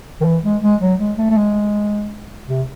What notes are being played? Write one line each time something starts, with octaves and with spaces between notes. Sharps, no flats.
D#3
E3
G#3
G#3
F#3
G#3
A3
A3
G#3
C3